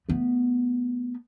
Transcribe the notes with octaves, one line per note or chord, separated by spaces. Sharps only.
A3 B3